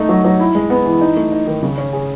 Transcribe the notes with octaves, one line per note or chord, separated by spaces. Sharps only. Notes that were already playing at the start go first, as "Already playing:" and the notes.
Already playing: A3 D#4
F#3
F#3
E4
G#3
B3
E3
D#4
A3
D#4
D#3
C#3
C#4
G#4